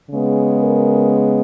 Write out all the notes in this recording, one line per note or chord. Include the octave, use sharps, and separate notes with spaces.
C#3 G#3 B3
A#4